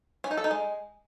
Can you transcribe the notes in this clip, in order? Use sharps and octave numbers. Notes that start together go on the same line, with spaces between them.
C#4
D#4
A4
D#4
G#3